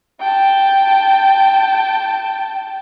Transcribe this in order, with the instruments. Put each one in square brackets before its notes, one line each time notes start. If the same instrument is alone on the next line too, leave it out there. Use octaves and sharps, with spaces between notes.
[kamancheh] G5 A5